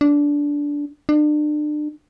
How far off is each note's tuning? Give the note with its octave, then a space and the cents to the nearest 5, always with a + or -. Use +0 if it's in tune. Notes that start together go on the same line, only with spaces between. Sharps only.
D4 -15
D4 +35